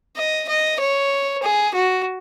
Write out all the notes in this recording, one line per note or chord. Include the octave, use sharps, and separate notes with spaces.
D#5
D#5
C#5
G#4
F#4